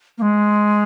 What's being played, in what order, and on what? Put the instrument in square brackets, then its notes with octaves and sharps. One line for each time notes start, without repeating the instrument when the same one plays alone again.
[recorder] A#3
G#3